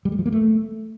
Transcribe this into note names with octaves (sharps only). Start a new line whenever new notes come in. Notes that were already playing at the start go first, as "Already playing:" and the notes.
G3
G#3
F3
A#3
A3